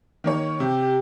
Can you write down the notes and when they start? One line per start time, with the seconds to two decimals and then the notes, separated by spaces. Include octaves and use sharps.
0.24 D#3 A#3 C#5
0.60 C3 G4